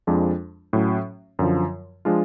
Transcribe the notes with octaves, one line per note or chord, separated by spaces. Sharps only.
F2 F3 G#3 D4 F4
A2 F#3 C#4
F#2 D3 F3
F3 G#3 D4 F4